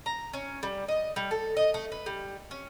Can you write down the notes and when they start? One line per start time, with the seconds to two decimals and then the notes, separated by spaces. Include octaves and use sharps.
0.06 A#5
0.34 C#4
0.63 G3
0.88 D#5
1.16 G3
1.31 A4
1.57 D#5
1.74 A3
1.92 B4
2.06 G3
2.51 C#4